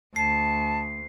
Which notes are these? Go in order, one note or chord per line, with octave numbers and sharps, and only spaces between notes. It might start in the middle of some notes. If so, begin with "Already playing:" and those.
D2 A5 C7